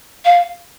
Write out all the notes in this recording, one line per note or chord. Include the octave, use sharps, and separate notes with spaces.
F5